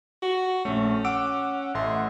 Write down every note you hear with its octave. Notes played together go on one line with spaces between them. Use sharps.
F#4
A#1 A3 C#4
F#5 D6 E6 D7
A1 A3 C6